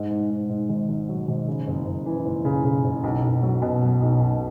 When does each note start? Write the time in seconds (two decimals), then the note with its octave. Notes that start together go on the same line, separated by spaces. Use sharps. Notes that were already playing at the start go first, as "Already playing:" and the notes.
Already playing: G#2
0.10 G#2
0.30 G#2
0.49 G#2
0.69 G#1
0.89 G#1
1.08 F#3
1.28 G#1
1.47 C#3
1.67 F#1
1.87 F#1
2.06 E3
2.25 F#1
2.45 C#3
2.65 C#3
2.84 F#1
3.04 B1
3.24 B1
3.43 F#3
3.62 B2
3.82 F#3
4.01 B1
4.21 B1